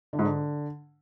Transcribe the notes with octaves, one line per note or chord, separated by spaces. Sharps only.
D3
G#2
D3